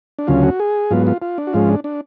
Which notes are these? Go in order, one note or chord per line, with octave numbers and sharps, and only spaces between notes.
D4
D2 C#3 F#3 C#4 F4
F#4
G#4
G#2 F#3 B3 F4
F4
F4
D4
F#4
G#2 F3 G#3 C#4 F4
D4
D4